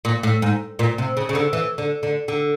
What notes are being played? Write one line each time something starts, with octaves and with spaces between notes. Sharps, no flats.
A#2
A2
G#2
A#2
C3
C#3
C#3
D3
E3
D3
D3
D3